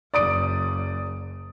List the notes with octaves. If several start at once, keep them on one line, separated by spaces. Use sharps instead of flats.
F#1 D5 D#6 D7